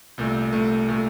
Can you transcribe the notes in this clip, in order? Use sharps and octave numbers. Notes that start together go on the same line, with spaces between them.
C2 A#2 A3
C2 A#2 A3
A#2 A3